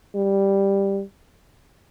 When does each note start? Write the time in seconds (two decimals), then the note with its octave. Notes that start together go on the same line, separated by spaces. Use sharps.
0.15 G3